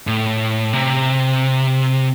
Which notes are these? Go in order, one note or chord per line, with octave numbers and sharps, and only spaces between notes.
A2
C3